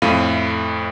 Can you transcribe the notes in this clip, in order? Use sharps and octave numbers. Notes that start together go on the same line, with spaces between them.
F2 A2 A3 F5 D#7